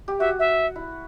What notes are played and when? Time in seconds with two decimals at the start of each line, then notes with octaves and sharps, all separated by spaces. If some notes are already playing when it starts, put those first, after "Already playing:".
0.08 G4
0.20 F#4 E5
0.39 E5
0.76 E4